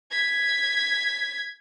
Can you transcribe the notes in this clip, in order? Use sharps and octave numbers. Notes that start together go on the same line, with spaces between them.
G#6 B6